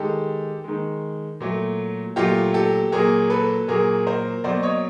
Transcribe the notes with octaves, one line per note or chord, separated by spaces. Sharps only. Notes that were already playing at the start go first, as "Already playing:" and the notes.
Already playing: D#3 G#3 G4 A4
D#3 G#3
A#2 F#3 A3
A#2 F#3 A3 F4 G4
G4 A4
A#2 F#3 A#3 G#4 A#4
A4 B4
A#2 F#3 A#3 G#4 A#4
A#4 C5
B2 F#3 A#3 C5 D5
C#5 D#5